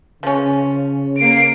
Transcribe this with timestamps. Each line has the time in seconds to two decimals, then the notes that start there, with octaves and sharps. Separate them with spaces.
0.23 C#3 F3 C#4
1.19 A#3 C7 D7